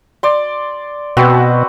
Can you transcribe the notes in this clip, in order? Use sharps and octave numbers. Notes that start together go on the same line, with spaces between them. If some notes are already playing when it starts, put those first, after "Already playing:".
D5 C6
B2 C4 F#4 B4